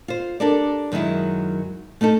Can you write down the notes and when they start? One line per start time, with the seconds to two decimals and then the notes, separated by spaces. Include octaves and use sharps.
0.08 F4 C5
0.40 D4 G4 A4 A#4 D5
0.92 F#2 D#3 F#3 G#3 E4
2.01 A3 C#4 D#4 A4